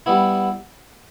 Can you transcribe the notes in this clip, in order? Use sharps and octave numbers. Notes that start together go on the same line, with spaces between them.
G3 B3 E4